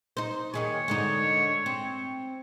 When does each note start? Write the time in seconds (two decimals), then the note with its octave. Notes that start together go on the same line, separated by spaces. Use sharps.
0.17 D#4 C5
0.54 D#2 D#3 G#4 C#5
0.88 G#2 D3 D#4
1.66 C4